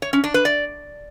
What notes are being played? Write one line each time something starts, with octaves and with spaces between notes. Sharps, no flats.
C#5
C#4
D4
B4
D5